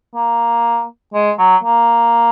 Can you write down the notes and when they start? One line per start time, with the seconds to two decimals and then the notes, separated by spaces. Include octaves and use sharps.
0.15 A#3
1.14 G#3
1.39 F#3
1.63 A#3